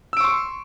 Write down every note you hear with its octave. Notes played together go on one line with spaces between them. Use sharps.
C6 C#6 E6 D7